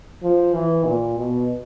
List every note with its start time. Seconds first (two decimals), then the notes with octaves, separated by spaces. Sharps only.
0.23 F3
0.54 E3
0.86 A#2
1.17 B2